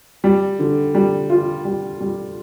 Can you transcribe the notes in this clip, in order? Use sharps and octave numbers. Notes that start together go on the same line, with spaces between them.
G3
D3
G3
F4
G3
G3